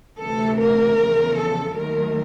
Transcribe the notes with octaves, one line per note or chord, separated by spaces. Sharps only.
D2 C3 E3 A3 A4
A#4
E2 C#3 F3
A4
D#2 D#3 F#3 A3 A#4